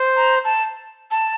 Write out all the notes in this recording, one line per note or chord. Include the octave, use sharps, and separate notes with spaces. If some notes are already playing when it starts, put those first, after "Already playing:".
Already playing: C5
A#5
A5
A5